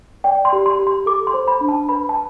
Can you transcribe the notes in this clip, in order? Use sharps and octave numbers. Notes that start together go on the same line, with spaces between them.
D5 G5
C6
G4
C6
G4
C6
A4 D6
C6
C5
B5
D4
A5
B4 B5
A5